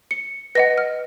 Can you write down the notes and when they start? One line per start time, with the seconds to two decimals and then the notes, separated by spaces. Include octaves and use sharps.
0.11 C#7
0.55 B4 D#5 F#5 A#6
0.78 F6